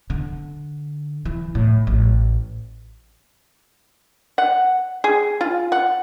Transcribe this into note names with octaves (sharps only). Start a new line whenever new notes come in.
D3
E3
A2
A1
F#5
G#4
F4
F#5